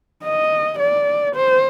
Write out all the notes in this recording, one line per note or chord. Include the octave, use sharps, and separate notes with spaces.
D#5
D5
C5